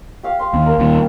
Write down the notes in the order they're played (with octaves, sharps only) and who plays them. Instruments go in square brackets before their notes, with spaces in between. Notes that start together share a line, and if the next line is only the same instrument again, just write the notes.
[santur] G4 F5
C6
[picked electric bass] D#2
[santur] A#4
[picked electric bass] D#2 A#2